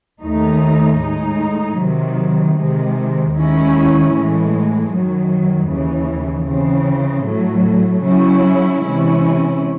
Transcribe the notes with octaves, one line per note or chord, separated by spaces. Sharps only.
D#2 D#3 A3 D#4
A2 G#3 D#4
C3 D#3 F#3
C3 D#3 G#3
D#2 D#3 G#3 C#4 E4
A2 E3 G#3
F#2 D#3 F#3
D#2 C#3 E3
C#3 E3 C4
A2 F#3 A3
C#3 F#3 C#4 E4
C3 E3 G#3 C#4 E4